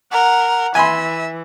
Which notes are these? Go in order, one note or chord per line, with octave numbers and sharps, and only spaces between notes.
A#4 F#5
E3 E5 G#5 B5 C6